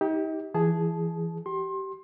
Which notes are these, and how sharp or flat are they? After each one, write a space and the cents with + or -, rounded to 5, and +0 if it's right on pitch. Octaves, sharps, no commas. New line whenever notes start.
D#4 +40 G4 +0
E3 +20 G#4 +0 A5 -20
G4 -25 C6 +25